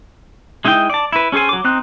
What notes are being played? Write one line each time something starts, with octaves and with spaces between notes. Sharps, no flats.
G#3 D#4 E4 D#5 G5
D5 A5
E4 B4
C#4 G#4 A4 C5 G#5
F#3 D6
C4 D#4 F#6